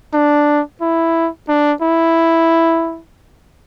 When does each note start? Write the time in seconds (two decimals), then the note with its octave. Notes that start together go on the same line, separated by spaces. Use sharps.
0.14 D4
0.81 E4
1.49 D4
1.82 E4